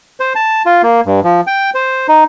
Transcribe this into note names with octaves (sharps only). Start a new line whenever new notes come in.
C5
A5
F4
A#3
G2
F3
G5
C5
D#4